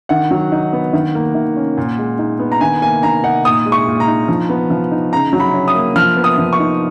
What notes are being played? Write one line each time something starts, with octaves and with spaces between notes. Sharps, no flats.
D#3 F#5
F#3
D#4
B3
D#3
A#3
D#3
C#4
A#2
G#3
D#4
B3
A#5
D#3 G#5
A#3 G#5
D#3 A#5
D#4 F#5
A#2 D#6
G#3
C#6
A#2
A#5
D#4
F3
B3
F3
D#4
C#3 A#5
F#3
B5
C#4
D#6
A#3
F3 F6
B3
D#6
F3
C#6
D#4